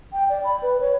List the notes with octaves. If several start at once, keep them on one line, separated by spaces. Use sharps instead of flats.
G5
D5
B5
B4
C#5